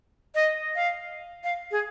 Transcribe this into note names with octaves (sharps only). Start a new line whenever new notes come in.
D#5
F5
F5
G#4